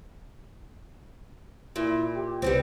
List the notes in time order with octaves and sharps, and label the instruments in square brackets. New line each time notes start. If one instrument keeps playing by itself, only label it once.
[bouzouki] A#2 [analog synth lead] E4
[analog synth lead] G4
[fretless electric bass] C2 [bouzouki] G3 B3 C4